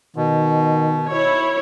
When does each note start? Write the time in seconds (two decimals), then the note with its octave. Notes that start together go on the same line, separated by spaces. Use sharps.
0.16 B2 D#3
1.10 E4 C#5